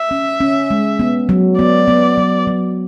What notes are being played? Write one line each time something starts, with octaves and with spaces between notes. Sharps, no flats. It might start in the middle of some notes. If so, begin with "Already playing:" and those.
Already playing: E5
C#4
C#4
G#3
B3
F#3
B3 D5
B3
F#3
F#3